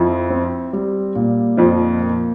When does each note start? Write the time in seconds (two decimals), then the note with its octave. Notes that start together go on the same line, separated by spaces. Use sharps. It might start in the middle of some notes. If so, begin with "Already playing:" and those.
Already playing: F2 F3 E4
0.30 C4
0.73 G3
1.16 A#2
1.57 F2 F3 D#4
2.00 A#3